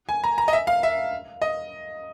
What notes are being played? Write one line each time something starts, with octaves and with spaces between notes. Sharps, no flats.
G#5
A#5
A#5
D#5
E5
F5
E5
D#5